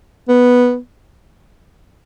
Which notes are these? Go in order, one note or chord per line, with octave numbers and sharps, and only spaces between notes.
B3